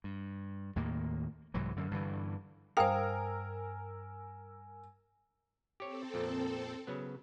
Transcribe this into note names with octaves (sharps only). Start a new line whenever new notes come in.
G2
D#2 A2 D#3 A#3
C2 G#2 E3 F#3
F#2 D3
G2 D3 E3
G2 A#4 C5 F5 G5 G#5 D#6 E6
C4 G4 A4 C#5
F2 A#2
C#3 F#3 B3